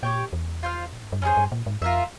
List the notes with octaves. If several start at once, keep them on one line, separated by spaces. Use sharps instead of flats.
A#2 G4 C#5 G5
E2
F4 C5 F5
A#2
G#2
G2
F2 C#4 E4 G#4 C5
G2
A#2
G#2
F2 F4 A#4 E5